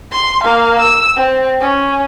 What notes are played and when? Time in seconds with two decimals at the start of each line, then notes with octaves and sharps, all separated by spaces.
0.12 C6
0.44 A#3 F5
0.80 E6
1.16 C4
1.61 C#4